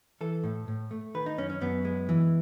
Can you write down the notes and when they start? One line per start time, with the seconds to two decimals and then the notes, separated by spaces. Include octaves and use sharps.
0.21 E3 A4
0.44 A2
0.68 A2
0.91 A3
1.15 D#3 B4
1.26 D#4
1.37 F#2 C#4
1.50 C#4
1.61 F#2 B3
1.85 G#3
2.09 E3